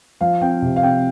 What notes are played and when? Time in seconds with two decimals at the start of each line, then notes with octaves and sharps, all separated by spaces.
0.21 F3 F5
0.41 C4 G5
0.62 C3
0.76 F5
0.83 C4 G5